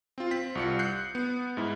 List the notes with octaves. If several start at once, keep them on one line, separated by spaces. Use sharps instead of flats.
C4 F4
C4 B6
C2 F4 C#7
F#6 G6 C7 C#7
B3
G#2 E4